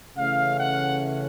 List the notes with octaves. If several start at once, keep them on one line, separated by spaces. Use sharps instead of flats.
C#3 E3 A3 C#4 F5
F#5